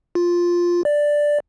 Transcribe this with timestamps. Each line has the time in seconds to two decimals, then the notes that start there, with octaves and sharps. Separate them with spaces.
0.15 F4
0.85 D5